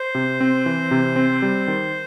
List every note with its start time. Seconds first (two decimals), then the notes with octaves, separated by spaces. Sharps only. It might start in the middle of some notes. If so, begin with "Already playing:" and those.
Already playing: C5
0.15 C3
0.40 C4
0.66 E3
0.91 C3
1.16 C4
1.42 G3
1.68 D#3